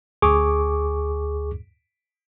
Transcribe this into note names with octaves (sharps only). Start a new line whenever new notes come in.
D2 G#4 C#6 D6